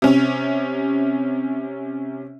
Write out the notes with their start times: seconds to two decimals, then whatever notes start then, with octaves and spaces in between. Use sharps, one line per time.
0.02 C3 C#4